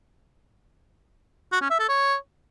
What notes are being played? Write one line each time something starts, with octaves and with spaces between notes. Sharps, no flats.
F#4
C#4
E5
A4
C#5